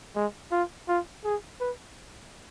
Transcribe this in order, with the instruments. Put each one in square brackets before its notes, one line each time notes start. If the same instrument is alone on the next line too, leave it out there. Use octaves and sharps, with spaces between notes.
[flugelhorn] G#3
F4
F4
G#4
B4